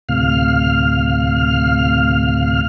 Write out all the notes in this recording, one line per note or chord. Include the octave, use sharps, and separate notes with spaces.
D2 A2 C3 F5 F6